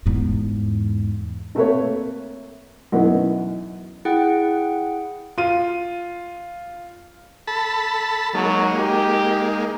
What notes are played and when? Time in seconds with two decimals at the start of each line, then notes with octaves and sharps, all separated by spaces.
0.06 E2 G#2
1.55 C3 A3 A#3 A4 B4 C#5
2.92 F#2 B2 E3 B3 D#4
4.05 E4 G#4 F#5 G5
5.38 F4 D#7
7.47 A4 A5 B5
8.34 F#3 G#3 A#3 D#4
8.78 G4